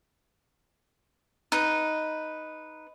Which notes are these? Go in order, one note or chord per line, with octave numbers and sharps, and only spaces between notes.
D#4 B4